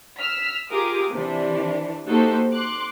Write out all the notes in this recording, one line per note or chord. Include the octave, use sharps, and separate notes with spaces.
E6 F6 B6
F4 G4 G#4 A#4 D6 D#6
C3 E3 D4
A#3 D#4 F#4 G4 A4 C5
C6 D6 F#6